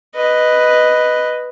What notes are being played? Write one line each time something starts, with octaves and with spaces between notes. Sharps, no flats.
B4 D#5